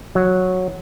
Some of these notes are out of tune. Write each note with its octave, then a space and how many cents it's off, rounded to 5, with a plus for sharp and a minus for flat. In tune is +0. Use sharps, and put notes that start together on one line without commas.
F#3 -10